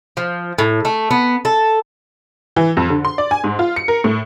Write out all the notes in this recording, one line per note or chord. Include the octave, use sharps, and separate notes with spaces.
F3
A2
A3
B3
A4
E3
F2
D3
C6
D5
G#5
G#2
F4
C#7
A#4
A2